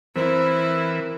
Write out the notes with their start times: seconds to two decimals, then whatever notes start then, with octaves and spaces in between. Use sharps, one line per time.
0.16 E3 C4 E4 A#4